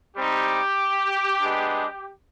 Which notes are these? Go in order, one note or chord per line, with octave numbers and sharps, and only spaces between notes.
G3 C4 D#4 G4
G#3 B3 D4